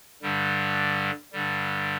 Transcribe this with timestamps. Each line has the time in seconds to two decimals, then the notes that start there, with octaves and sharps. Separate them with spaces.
0.22 G2 D3 G3
1.33 G2 D3 G3